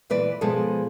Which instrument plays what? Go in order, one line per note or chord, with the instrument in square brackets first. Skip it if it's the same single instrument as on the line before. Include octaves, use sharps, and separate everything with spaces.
[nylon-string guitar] A#2 E3 B4 D5
B2 F3 G#3 G#4 A4